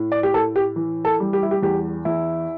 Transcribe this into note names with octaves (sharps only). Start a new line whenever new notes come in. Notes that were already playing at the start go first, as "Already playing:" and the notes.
Already playing: A2
D5
G4
A2 A4
G4
E3
A4
G3
G4
E4
G4
E2 G4
E2 E4